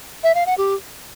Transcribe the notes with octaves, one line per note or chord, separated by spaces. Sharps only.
E5
F5
F#5
G4